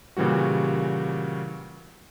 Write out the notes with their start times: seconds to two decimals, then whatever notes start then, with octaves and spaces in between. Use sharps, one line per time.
0.17 A#2 C#3 E3 G3 F#4